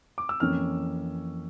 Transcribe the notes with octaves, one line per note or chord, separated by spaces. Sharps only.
D6
E6
F2 E3 A#3 C#4 F6